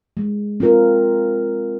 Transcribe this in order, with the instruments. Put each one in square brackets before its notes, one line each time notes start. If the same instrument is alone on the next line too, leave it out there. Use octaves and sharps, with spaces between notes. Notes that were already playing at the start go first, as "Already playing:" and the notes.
[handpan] G#3
C4 F4 A#4